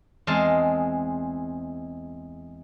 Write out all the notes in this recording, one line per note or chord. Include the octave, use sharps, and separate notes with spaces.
E2 G#3 C4 D#5 F5 A5